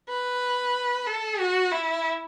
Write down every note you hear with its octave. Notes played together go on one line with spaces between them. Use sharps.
B4
A4
F#4
E4